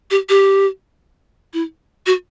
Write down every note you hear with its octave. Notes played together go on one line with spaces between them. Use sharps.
G4
G4
E4
F#4